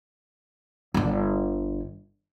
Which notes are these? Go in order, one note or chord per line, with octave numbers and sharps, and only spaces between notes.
G1 D3